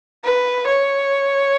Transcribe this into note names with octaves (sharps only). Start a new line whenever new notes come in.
B4
C#5